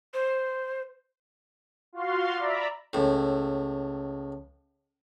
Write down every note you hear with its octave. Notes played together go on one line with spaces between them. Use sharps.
C5
F4 F#4 F5 C6
D5 E5 A#5 B5
C#2 A2